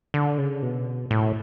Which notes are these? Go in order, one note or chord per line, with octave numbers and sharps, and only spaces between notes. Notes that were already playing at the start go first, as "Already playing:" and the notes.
D3
C#3
B2
A2